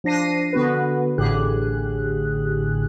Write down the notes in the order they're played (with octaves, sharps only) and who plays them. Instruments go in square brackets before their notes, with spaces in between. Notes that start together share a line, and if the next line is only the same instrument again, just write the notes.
[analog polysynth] F3 D4 A#6 C7 D#7
D3 B3 F#4 B4
A1 A2 D3 G4 G#4 F#6